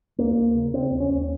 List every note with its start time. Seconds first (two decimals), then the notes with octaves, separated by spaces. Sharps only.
0.18 D#2 A#3
0.36 D#2
0.55 C#3
0.73 C#3 C4
0.91 D#2
1.00 C#4
1.10 D#2